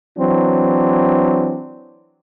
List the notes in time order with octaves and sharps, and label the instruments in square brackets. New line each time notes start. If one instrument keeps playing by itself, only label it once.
[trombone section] E3 F#3 C4 D4